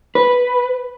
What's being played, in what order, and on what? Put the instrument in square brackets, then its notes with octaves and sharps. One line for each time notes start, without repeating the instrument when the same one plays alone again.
[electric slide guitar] B4